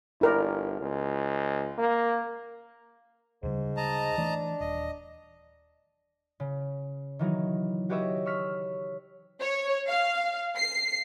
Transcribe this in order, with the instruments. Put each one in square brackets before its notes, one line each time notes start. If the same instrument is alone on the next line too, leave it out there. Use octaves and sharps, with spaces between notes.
[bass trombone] G1 [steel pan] E4 A#4 D5
[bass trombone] C#2
A#3
[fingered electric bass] D2 C#3 G3 [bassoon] G#2
[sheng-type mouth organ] D#5 A5 A#5
[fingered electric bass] E3 A3 [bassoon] D4
[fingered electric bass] D#1 [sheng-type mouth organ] D#5
[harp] C#3
D#3 E3 F#3 D#4
F#4 G4 B4 C#5 D#5 E5
C#6 E6 F6 B6 C#7
[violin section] C#5
F5
C7